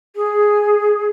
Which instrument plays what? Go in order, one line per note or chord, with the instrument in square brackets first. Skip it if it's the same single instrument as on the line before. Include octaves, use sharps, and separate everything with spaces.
[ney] G#4